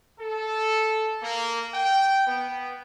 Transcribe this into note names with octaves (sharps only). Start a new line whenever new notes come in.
A4
A#3
G5
B3